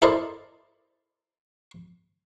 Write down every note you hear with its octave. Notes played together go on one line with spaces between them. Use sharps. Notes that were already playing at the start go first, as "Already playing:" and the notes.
E4 A4 A#4 C5 D5 D#5